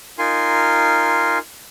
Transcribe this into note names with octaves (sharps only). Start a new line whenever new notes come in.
D#4 F4 A#4 G#5 C6